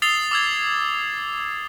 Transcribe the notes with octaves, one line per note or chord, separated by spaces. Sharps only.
D#6 E6 A6 C7 F7 G7
D6 E6 G#6